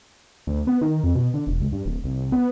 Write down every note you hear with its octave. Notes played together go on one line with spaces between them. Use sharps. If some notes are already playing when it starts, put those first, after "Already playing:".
D2
B3
D#3
F2
B2
D3
E1
C#2
G2
D1
C2
B3